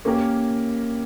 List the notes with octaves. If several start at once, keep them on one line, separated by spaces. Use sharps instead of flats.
A#3 C#4 G4 A#4